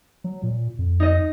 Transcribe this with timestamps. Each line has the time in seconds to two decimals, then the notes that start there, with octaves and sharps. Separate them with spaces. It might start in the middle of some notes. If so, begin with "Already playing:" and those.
0.24 F#3
0.43 A#2
0.79 F2
1.00 D#4 D#5